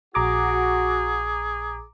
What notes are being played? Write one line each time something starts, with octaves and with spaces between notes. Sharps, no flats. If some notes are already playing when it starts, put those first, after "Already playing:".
A#1 F#4 G#4 A#5 D6